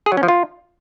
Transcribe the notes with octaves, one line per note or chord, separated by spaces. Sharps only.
G#4
F#3
C#4
F3
F4